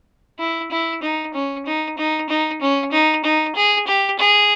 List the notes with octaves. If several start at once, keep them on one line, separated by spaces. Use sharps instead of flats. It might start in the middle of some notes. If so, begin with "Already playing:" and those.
E4
E4
D#4
C#4
D#4
D#4
D#4
C#4
D#4
D#4
G#4
G4
G#4